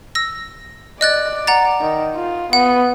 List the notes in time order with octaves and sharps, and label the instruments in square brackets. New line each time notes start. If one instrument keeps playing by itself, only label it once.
[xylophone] E6 A#6
[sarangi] D5 [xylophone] D#5 F#6 A6
[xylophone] F#5 A#5 A6
[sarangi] D#3
F4
[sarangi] B3 [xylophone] F#5